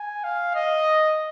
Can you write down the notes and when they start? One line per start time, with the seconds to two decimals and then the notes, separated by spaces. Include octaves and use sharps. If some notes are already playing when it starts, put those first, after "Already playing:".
Already playing: G#5
0.24 F5
0.55 D#5